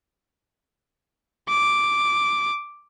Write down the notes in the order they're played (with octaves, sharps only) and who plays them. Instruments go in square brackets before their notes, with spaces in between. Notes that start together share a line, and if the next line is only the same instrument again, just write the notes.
[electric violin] D6